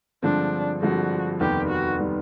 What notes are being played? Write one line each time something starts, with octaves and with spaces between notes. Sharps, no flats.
G2 D3 F3 G#3 C4 D4
G2 D3 F3 G#3 C4 F#4
F1 D#2 D#3 G3 B3 G4
F#4
D#3 G3 B3